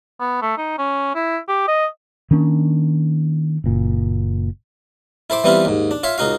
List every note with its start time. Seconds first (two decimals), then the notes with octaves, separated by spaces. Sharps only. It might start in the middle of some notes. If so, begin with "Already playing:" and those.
0.20 B3
0.42 A3
0.58 D#4
0.78 C#4
1.15 E4
1.48 G4
1.68 D#5
2.31 D#3 A#3 C#4 D4
3.64 F#1 A#2
5.30 E4 A4 C5 D6
5.44 E3 G3 B3 C4 E4 F4
5.65 D#2 G#2
5.91 D4
6.03 F4 C#5 E5 F5
6.18 C#2 D#4 F#4 F5